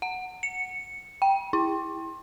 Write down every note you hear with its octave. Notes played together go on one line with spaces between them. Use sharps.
F#5
C#7
G5
E4